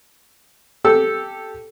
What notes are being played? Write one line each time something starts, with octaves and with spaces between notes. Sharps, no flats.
G4 A4 E6